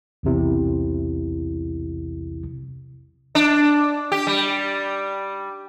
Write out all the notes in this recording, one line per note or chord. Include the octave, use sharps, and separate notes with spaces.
B1 E2 C3 E4
D4
G4
G3